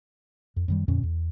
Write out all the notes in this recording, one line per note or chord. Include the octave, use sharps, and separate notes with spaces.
F2
F#2 D#3 G3
F2 A#2 D3 C#4
E2